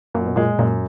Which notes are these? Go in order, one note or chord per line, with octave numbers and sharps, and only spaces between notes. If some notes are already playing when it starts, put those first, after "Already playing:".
F#2 A#2
B2
A#2 G#3
F#2 A#2